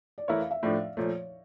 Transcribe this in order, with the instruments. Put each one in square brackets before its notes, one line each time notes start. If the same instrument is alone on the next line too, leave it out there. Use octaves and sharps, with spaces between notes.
[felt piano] D5
[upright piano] E3 A3 E4 A#4 C#5 [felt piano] E5
[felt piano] F5
E5
[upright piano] A2 F3 A3 D4 [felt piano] D5
[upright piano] A#2 F3 A3 [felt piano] C#5